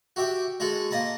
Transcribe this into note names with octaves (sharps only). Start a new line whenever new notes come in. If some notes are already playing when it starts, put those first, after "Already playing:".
F#4 G4 E5 G5
G#3 F#4 G#4 A4
A#3 D#5 A5 B5